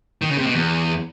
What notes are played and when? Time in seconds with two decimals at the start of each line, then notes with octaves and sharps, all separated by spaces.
0.22 D#3
0.30 C#3
0.38 C3
0.46 B2
0.55 E2